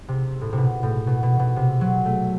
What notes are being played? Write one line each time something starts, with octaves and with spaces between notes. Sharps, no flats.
C3
A2
C3
B2
A2
B2
B2
B2
C3
F#3
A3